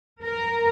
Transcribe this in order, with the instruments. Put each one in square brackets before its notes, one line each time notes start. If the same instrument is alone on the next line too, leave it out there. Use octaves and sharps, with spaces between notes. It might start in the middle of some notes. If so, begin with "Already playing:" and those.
[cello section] A#4